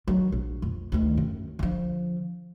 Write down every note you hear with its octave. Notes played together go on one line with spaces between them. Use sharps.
D#3 F#3
A#1
F2
D2 D#3
F#2
D3 F3